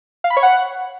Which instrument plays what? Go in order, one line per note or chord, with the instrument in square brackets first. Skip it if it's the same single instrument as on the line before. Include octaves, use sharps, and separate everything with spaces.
[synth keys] F5
B5
C#5
F#5